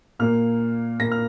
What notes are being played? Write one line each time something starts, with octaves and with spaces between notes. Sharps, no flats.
A#2 A#3 F6
A#2 A#3 A#6
F6